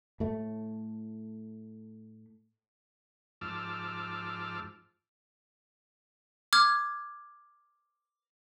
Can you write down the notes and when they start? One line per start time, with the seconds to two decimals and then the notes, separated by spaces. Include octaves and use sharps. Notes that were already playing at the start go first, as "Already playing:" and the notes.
0.20 A2 A3
3.41 G#2 F3 A5 D6 E6 F6
6.53 D6 F6 G#6